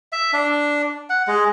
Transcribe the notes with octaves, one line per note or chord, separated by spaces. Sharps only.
E5
D4
F#5
G#3